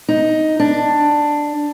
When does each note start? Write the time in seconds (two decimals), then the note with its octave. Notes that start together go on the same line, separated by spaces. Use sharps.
0.08 D#4
0.60 D4